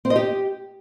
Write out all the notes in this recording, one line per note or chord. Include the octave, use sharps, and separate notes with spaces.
C4
D#5
G4